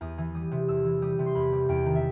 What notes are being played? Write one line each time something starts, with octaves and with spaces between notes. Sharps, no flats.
E2 D#6
E3
G3 D#6
C3
E2 E6
E3
G3 D#6
C3
C6
E2 B5
G3
E2 G5
D#3
E5